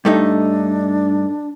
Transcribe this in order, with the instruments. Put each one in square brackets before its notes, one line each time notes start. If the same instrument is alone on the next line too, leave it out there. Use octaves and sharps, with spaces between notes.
[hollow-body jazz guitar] G2 A3 D#4 [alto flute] D4